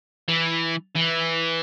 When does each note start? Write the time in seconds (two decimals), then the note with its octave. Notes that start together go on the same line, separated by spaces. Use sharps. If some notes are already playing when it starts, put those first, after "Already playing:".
0.28 E3
0.96 E3